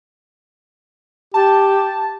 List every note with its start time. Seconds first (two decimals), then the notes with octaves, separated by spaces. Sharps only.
1.34 G4 A5